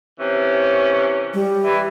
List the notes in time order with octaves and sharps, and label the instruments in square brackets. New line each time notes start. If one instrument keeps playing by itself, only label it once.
[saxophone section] C3 E3 C#4
[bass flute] G3
[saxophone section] E3